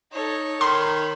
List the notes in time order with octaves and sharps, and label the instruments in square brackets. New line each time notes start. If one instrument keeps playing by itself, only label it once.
[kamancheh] D#4 A4 [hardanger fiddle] C#5
[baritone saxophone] D#3 [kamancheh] B5 [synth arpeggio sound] C6